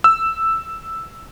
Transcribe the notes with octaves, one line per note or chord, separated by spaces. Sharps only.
E6